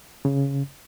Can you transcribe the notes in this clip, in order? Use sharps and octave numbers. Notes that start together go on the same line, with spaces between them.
C#3